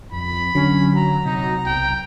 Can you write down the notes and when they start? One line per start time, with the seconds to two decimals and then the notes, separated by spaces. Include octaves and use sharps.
0.12 F2 B5
0.55 D3 F#3 C#4
0.95 A#5
1.25 C3 D#4
1.66 B1 G5